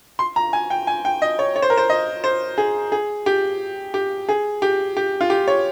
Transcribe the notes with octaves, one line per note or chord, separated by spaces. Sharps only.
C6
A#5
G#5
G5
G#5
G5
D#5
C#5
C#5
C5
A#4
C5
D#5
C5
G#4
G#4
G4
G4
G#4
G4
G4
F4
G4
C#5